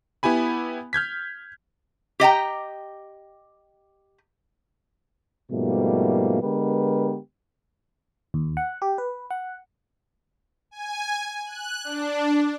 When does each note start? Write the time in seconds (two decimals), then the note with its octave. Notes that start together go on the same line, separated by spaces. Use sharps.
0.23 B3 E4 G4 G#5 B5
0.93 F6 G6 G#6 B6
2.20 G4 D#5 G5 A#5
5.51 G#2 B2 F3 G3 A3 A#3
6.42 D3 G#3 B3 G4 A#4 B4
8.34 D#2
8.57 F#5
8.82 G4
8.98 B4
9.30 F#5
10.71 G#5
11.46 F#6
11.84 D4